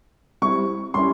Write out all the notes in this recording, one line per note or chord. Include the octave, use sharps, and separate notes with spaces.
G3 C4 E4 C#6
G3 C#4 E4 C6